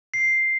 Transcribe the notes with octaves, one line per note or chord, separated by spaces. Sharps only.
C7